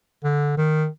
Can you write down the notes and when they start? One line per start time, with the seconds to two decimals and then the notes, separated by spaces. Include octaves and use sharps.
0.24 D3
0.57 D#3